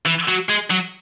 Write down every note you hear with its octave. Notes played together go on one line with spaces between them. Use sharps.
E3
F#3
G#3
F#3